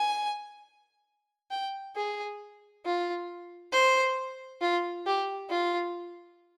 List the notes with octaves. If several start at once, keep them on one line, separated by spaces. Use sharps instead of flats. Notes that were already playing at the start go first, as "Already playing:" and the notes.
Already playing: G#5
G5
G#4
F4
C5
F4
G4
F4